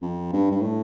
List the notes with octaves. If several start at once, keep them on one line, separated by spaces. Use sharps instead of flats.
F2
G2
G2
A2